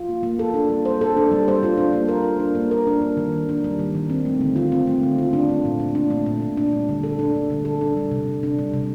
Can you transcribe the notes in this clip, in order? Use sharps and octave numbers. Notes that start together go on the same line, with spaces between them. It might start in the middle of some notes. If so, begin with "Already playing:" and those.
Already playing: F4
A#3
A#3
A4
D4
G3
C5
A4
D4
G3
C5
F4
D4
A#3
A#4
F4
D4
A#3
A#4
D4
G3
D#3
D#3
D4
G3
D#3
D#3
C4
A3
D3
F4
C4
A3
D3
F4
D4
A3
A#2
A#2
D4
A3
A#2
A#2
D4
G3
D3
A4
D4
G3
D3
A4
D4
G3
C3
C3
D4
G3
C3